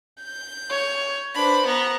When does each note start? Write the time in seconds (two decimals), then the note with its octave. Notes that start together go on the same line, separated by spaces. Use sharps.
0.23 G6
0.69 C#5
1.35 D4 B4 C5 B5
1.66 B3 A#5